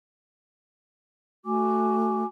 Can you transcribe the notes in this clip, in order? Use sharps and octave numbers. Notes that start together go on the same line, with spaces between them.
A3 F#4 G#5 D6